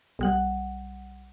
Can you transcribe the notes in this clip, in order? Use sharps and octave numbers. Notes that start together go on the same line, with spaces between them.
B1 G3 F#5